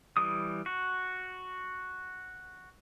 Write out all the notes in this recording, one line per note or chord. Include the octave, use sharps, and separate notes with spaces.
E3 G3 D#6
F#4